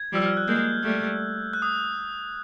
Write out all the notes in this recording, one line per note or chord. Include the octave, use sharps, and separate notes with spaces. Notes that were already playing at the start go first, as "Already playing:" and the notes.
Already playing: G#6
F3 G3 E6
F6
F#6
G#3 A#3 G6
G3 A3
F#6
D#6